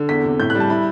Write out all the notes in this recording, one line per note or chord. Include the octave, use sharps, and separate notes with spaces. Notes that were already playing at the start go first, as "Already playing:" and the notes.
Already playing: D3
E2 B6
C3
A2 G6
F#6
G3
A5
E4 B5